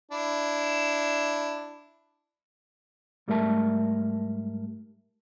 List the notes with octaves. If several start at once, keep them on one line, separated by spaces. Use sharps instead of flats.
D4 E4
G#2 G3 A3 A#4 E5 A5